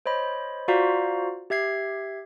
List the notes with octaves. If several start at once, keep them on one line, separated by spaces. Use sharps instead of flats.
C5 C#5 D#5 B5
F4 F#4 C5 D5 F5 A#5
G4 E5 G#6 C7